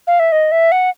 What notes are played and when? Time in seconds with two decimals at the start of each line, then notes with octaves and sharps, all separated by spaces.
0.07 F5
0.20 E5
0.32 D#5
0.52 E5
0.72 F#5